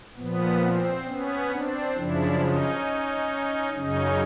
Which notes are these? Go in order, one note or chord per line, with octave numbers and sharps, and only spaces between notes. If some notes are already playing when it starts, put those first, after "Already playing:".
A#2 F3 B3
C4
B3 C#4
C4 D4
F#2 C#3 F3 D4 E4
C#4 D#4
F#2 C#3 F#3 C#4 D#4